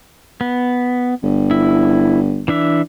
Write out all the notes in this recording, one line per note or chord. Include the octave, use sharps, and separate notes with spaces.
B3
G1
E4
E3 D4 E5